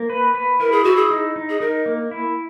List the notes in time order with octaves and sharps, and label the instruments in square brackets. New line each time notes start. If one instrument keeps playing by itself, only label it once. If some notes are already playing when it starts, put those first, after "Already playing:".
Already playing: [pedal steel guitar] A#3
B4
B4
[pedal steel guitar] E4 [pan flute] A#4
[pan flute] G#4
[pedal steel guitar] E4 [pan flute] F#4
[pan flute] G#4
[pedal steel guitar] D#4
D#4
[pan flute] G#4
[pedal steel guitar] D#4 [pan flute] A#4
[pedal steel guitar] A#3
E4